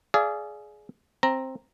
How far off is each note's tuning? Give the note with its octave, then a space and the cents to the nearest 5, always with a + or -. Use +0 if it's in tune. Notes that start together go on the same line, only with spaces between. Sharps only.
G#4 +15 D5 -5 F5 -35
C4 +10 A#5 +0